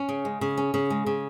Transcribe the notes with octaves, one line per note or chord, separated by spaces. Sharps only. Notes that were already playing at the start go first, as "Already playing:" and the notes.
Already playing: C#4
C#3
G#3
C#3
C#4
C#3
G#3
C#3